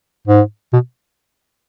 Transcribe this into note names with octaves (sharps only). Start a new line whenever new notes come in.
G#2
B2